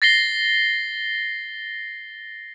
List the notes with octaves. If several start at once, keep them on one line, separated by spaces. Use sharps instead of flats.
A6 A#6 C7 G7